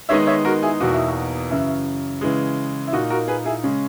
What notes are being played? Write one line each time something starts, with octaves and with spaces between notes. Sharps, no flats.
D#3 G#3 B3 D#4 C#5 E5
C#5 E5
F#4 A#4
E4 G#4
E2 B2 A#3 D#4 F#4
E4
F#4
F#2 C#3 E3 E4
C#3 E3 G#3
E4
A#2 A#3 D#4 F#4
F#4 A#4
G#4 B4
E4 G#4
C#3 G#3 C#4